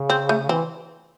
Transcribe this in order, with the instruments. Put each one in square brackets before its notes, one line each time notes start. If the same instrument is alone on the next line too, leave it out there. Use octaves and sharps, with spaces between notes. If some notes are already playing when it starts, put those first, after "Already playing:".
Already playing: [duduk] C#3
[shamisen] C4
A3
[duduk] E3 [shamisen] C4